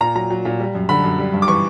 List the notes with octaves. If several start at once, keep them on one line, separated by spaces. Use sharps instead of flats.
A#2 A#5
F#3 A#5
F#3
A#2
G3
F#2
D3 B5
F#2
G3
G2
D6
E3 C#6